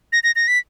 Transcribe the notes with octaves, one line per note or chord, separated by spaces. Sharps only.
A#6
A#6
A#6
B6